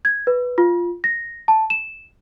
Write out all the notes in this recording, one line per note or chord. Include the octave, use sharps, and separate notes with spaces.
G#6
B4
F4
A#6
A5
E7